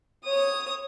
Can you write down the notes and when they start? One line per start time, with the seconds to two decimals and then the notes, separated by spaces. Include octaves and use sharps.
0.24 C#5 D#6